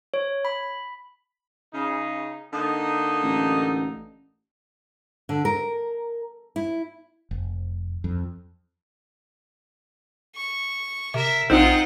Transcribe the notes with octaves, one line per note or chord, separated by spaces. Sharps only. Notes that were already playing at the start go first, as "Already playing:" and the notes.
C#5
B5
C#3 D#4
D3 A#3 D#4
A1
D3
A#4
E4
F1
F2
C#6
C3 A#4 E5
A#1 C4 D#4 F4 F#5